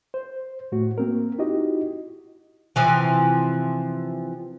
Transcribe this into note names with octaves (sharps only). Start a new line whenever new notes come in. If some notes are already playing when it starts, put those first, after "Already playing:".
C5
A2 A3 F#4
A#3 C4 A#4
D#4 E4 F#4 G4 D#5
C3 E3 F3